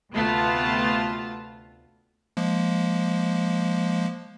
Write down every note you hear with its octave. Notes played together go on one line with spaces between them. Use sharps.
D2 C3 A3 B3 F4 A5
F3 G#3 A#3